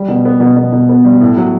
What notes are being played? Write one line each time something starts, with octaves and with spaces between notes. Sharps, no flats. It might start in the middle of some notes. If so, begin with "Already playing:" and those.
Already playing: G3
B2
B3
B2
B2
B2
B3
G3
A2
F#3